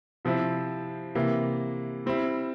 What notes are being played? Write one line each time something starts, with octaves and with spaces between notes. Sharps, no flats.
C3 F3 C4 E4
C3 E3 A#3 E4
G3 C4 E4